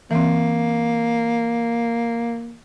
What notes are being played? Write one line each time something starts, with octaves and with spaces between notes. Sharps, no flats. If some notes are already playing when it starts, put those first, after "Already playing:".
E3 A#3 C4